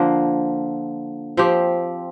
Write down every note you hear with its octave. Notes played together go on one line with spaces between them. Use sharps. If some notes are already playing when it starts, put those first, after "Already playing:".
Already playing: D3 F3 A#3
F3 C4 G4